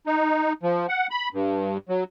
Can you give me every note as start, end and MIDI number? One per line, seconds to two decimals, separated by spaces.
0.07 0.53 63
0.63 0.87 53
0.89 1.07 78
1.11 1.29 83
1.34 1.78 43
1.89 2.04 54